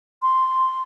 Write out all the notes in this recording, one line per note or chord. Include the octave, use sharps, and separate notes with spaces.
C6